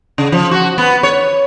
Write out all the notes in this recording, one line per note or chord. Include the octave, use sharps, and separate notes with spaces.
C#3
F3
F#4
B3
C#5